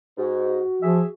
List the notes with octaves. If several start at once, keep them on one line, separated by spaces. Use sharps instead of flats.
G#2 F#4
F3 G#4 E5